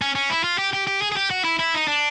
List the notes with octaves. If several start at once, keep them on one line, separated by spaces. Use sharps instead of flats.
C#4
C#4
E4
F4
G4
G4
G4
G#4
G#4
G4
F#4
E4
E4
D#4
D4